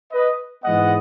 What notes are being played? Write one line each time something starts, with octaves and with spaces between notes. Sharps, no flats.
B4 D#5
G#2 E3 G#3 B3 D#5 F#5